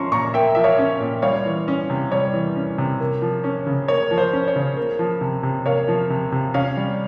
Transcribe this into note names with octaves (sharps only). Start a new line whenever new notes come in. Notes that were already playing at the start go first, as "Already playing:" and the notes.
Already playing: F3 C#4 A#5 C6 C#6
A#2 A#5 C#6
A#3 E5 G5
F3 E5
C#5 F5
C#4
A#2
G3 C#5 F5
E3
C#4
C3
G3 C#5
E3
C#4
C3
A#3
F3
C#4
C#3
A#3 C#5
F3
C5
C#4
C#5
C#3
A#3
F3
C3
C3
A#3 C#5 F5
F3
C3
C3
C#4 C#5 F5
G3